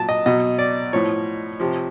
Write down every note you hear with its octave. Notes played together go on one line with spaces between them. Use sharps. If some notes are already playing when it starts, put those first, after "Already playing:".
Already playing: A#2 F#3 A5
D#5
B2 F#3 D#5
D5
A2 F3 C#5
C3 F3